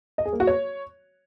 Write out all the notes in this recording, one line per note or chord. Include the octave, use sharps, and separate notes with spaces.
D#5
G#4
A#3
F#4
C#5